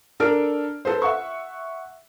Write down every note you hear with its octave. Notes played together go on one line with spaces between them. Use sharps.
D4 A4 A#4 F6 D7
A4 B4 C5
E5 F#5 C#6